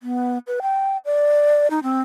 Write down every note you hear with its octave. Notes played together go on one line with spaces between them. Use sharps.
B3
B4
G5
D5
D#4
C4